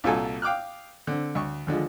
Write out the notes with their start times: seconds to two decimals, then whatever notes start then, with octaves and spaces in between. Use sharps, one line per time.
0.04 C2 A#2 F4 F#4 A4 G#5
0.42 F5 G5 D6 D#6 F6 F#6
1.07 D3 C4
1.35 D2 C#6
1.67 D#2 D3 F3 G#3